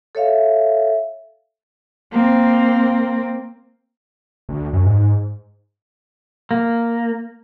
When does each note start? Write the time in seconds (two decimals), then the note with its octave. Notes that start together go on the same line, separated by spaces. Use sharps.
0.15 A4 C#5 E5 F5
2.12 A#3 C4
4.49 D2
4.73 F#2
4.85 G#2
6.51 A#3